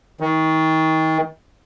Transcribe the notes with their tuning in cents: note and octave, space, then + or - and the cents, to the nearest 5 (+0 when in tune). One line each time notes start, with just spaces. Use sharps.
D#3 +35